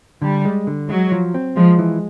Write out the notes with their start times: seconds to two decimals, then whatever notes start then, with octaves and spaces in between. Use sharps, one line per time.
0.22 D3 G3
0.45 G#3
0.67 D3
0.89 F#3 G#3
1.12 F3
1.34 C4
1.56 F3 G#3
1.79 E3